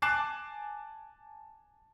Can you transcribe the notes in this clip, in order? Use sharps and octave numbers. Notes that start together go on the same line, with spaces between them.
G#5 A5 D6 F#6 C7 E7